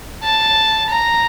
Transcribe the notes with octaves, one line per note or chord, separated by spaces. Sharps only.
A5
A#5